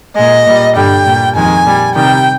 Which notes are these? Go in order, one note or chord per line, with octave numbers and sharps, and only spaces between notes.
A#2 G#3 D#5
A#2 G3
G2 D3 G3 G5
A#2 G3
F2 D#3 G#3 G#5
A#2 G3
C3 D#3 G3 G5